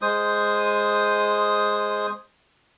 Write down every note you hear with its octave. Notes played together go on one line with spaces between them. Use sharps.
G#3 C5 D#6